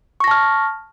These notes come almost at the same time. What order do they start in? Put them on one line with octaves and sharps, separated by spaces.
C#6 A#6 A5 F6